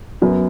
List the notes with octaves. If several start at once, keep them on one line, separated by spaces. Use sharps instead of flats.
F#2 F#3 B3